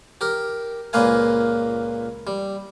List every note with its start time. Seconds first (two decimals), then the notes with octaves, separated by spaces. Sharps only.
0.21 G4 A#4
0.93 C#2 A#2 A#3 B4 F5 G#5
2.27 G3